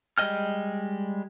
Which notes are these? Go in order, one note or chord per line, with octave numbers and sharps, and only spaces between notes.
G3 G#3 D#5 G5 F6